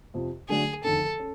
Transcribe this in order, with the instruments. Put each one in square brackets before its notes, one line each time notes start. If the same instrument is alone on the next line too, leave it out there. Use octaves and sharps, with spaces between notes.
[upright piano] F2 C3 F3
[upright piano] D3 F#3 A3 D4 [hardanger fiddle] G#4
[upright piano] F1 D#2 D3 [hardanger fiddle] A4
[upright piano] C#4